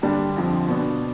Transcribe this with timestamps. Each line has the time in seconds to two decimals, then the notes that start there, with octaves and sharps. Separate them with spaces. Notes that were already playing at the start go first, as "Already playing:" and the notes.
0.02 G2 D3 G3 D4
0.36 F2 D3 F3 C4
0.68 B2 B3 D4